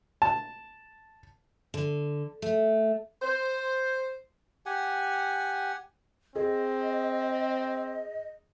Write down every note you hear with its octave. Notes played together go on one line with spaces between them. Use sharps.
A5
D3
A3
C5
G4 F#5 G#5
C4 G#4 D#5